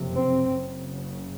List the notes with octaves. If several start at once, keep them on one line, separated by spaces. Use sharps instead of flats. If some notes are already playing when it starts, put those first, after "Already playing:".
Already playing: F#1 F2 C3
C4
F#1 F#2 C#3